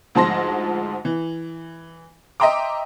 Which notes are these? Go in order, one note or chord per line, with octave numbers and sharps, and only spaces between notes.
D2 G#2 F3 A5 C6 A#6
E3
D#5 E5 G5 A#5 C6 D6